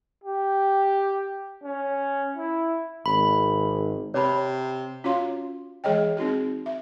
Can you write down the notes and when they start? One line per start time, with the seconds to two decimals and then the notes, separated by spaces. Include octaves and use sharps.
0.24 G4
1.63 C#4
2.37 E4
3.06 G#1 B5
4.14 C3 C#5 B5
5.04 C#4 F4 F#4 C#5 F5 C6
5.84 E3 G#3 G#4 C#5 D#5 G5
6.17 C4 D#4 F#4 G#4
6.66 E5